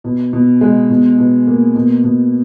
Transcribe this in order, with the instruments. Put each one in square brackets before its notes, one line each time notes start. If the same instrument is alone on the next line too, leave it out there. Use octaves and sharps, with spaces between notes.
[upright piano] B2
B2
G#3
B2
B2
A#3
B2
B2